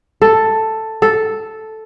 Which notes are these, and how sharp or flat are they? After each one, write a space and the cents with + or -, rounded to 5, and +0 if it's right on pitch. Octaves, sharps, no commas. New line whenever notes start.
A4 +5
A4 -5